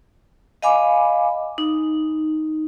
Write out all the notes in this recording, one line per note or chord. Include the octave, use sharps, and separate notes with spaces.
D#5 F5 G#5 B5 D6
D#4